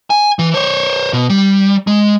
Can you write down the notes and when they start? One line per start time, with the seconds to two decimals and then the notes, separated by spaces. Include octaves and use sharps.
0.10 G#5
0.39 E3
0.54 C5 C#5
1.13 B2
1.29 G3
1.87 G#3